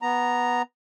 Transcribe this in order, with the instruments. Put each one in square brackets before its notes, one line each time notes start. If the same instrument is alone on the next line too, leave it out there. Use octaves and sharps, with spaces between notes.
[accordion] B3 A#5